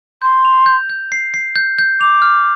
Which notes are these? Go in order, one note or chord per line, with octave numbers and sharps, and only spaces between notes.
C6 G6
F7
G6
G6
C7
C7
G6
G6
D6 F7
F6